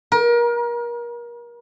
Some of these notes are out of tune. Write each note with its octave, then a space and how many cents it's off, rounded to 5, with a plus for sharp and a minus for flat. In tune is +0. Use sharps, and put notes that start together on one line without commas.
A#4 +30